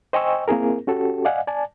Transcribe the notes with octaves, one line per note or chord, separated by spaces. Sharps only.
C5 D#5 G5 G#5 C#6 E6
A#3 C4 E4 G#4 A#4
C#4 F#4 G4 A4
D5 D#5 F5 F#5 G#5
D5 G#5 A5